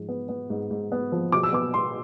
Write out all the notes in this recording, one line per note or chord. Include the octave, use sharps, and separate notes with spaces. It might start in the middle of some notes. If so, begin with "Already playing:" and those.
Already playing: G#2 F3
B3
B3
G#2
G#2
B3
F3
B2 D6
E6
B3 D6
B3 C6